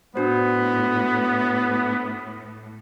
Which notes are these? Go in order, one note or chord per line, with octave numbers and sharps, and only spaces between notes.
A2 B3 D4 F#4 C5